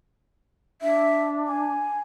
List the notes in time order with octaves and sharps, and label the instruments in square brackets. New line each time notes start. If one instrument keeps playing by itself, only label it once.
[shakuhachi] D4 [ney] E5
[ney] G#5